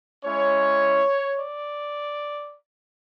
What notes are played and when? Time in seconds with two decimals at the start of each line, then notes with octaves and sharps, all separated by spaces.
0.25 G#3 C#4 E4 C#5
1.38 D5